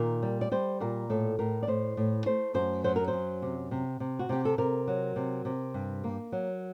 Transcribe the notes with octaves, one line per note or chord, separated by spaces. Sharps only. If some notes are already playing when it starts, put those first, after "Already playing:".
Already playing: A#2 D#3 A#4
G3
D5
G3 C5
A#2 A#4
A2 A4
A2 A#4
D5
A2 C5
A2
A3 C5
F#2 C5
F#3 C5
A#4
C5
F#2
C3
C3
C3
F#4
C3 G4
A4
C3 A#4
F#3
C3
C3
G2
A#3
F#3